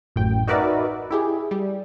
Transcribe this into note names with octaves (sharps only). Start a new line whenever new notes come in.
A1 F#2 A2 G5
D#4 F#4 A#4 B4 D5 E5
E4 G4 G#4
G3